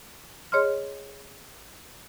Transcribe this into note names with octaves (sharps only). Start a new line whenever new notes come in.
G#4 C#5 D#5 C6 F6